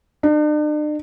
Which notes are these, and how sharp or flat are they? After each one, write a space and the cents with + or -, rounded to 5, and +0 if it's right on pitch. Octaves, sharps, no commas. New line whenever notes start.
D4 +45